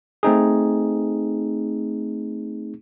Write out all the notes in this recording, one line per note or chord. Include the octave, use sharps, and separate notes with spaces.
A3 C4 D#4 G#4